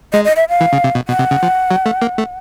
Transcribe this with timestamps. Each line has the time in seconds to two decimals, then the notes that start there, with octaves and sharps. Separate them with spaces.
0.13 G#3 D#5
0.25 D#5
0.36 E5
0.49 F5
0.60 E3
0.73 C#3
0.84 C3
0.95 B2
1.08 B2 F#5
1.19 C3
1.31 C#3
1.43 F3
1.71 F#3
1.86 A3
2.02 A#3
2.18 A3